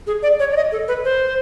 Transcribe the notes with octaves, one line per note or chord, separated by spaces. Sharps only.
G#4
D5
C#5
D5
D#5
A4
B4
C5